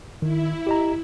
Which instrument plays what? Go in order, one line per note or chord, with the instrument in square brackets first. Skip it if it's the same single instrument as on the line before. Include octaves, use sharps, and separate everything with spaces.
[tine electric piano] D#3 [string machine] E4
[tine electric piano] G4 D#5 A#5